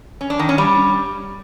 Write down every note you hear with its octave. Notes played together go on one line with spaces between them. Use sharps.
C#4
D4
D#3
C#4
G3